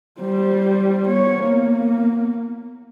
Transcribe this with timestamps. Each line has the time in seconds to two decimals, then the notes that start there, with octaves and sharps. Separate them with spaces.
0.20 G3 C5
1.07 B3 C#5
1.42 A#3 B3